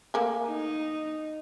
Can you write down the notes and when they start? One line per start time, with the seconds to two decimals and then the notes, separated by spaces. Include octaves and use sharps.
0.14 A3 A#3 G#4
0.46 D#4